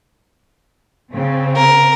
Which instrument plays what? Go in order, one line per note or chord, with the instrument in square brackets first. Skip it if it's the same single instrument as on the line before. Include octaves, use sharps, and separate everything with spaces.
[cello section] C#3 C4
[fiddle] A#4